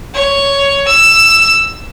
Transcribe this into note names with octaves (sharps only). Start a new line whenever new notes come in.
C#5
E6